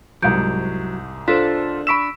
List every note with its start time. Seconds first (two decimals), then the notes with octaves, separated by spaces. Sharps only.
0.22 C2 G#2 F#3 G6 D7
1.28 D4 F4 A4 C5 B6 E7
1.87 B5 C#6 E6 B6 D7 E7